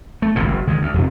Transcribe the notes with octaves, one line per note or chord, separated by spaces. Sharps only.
A3
G#1 D2 G2 A#2
F#1
D3 D#3 G#3
D2
F2 C3